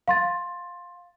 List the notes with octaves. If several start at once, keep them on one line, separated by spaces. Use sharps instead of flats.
F5 C6 A6